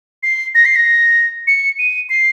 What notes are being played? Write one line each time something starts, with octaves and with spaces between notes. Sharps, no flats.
C7
A#6
C7
A#6
C#7
D#7
C7